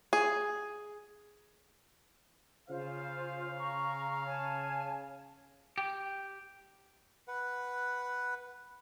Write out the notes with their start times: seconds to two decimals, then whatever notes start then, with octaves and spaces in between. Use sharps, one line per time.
0.13 G#4
2.68 C#3 F4 C5 F5
3.57 A#5 C#6
4.23 C#5 G#5 A5
5.78 G4
7.28 B4 F#5